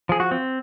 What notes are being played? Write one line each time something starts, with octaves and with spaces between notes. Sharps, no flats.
F3 G#4
F#4
C4